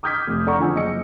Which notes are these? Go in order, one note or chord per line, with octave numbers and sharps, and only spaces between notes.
D6 D#6 F6 G6 G#6 B6
F1
A4 D5 F#5 A#5 C#6
D3 F3 G#5 E6
F#1 D#5 C#7